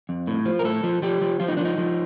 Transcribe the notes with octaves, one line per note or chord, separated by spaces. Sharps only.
F2
A2
F3
A#4
A2 A4
F3
F3 G4
F3
F3 F4
D#4
F3 D4
D#4
F3